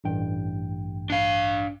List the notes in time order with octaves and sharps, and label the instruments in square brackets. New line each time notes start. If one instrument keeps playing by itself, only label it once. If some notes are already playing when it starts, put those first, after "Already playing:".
[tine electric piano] A1 G2 G5
[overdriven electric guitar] D4 F5